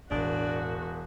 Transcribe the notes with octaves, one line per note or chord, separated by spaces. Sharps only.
E1 A1 D4 F#4 A#4